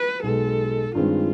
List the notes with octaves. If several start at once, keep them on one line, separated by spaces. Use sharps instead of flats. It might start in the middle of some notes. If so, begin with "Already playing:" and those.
Already playing: B4
B1 B2 G#3 A4
G2 D#3 G#3 C4 F4